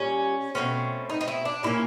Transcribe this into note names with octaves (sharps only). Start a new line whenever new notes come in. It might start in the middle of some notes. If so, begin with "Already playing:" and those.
Already playing: A#2 G3 C#4
B2 F#3 A3 C4 C#4
D#4
D#4
E4
D4
A#2 F3 A#3 C#4 E4